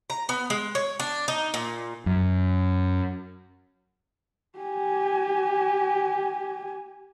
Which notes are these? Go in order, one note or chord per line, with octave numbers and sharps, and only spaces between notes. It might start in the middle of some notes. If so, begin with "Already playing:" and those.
A#5
B3
G#3
C#5
D4
D#4
A#2
F#2
G4 G#5